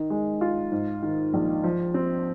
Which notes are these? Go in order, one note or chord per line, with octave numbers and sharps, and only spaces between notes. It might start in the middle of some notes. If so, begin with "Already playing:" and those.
Already playing: D#3
G#3
F4
G#2
D#3
A#1
F3
C4